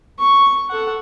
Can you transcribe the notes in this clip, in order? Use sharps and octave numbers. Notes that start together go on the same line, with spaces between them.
C#6
A4 F#5